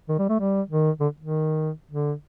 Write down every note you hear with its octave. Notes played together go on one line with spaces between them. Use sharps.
D#3
G3
A3
G3
D#3
D3
D#3
D3